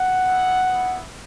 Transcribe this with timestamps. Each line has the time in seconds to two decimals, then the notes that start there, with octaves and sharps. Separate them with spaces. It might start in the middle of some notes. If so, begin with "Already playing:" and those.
Already playing: F#5
0.25 B3 E4
0.68 B3 E4